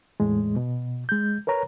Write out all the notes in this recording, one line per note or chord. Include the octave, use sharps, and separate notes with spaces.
E2 A2 G#3
B2
G#3 G6
A#4 B4 C#5 A#5